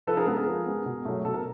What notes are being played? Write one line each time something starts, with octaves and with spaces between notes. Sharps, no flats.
F3 A4 B4
G#4 A#4
G#3 B3 A4 B4
G#4 A#4
F3
G#3 B3
B2
F#3 A3
B2 A4
A#4